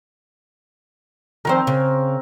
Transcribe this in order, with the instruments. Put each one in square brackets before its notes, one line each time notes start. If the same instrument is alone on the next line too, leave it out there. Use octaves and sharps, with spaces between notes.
[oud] D#3 F3 C5 [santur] C4 A#4
[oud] C#3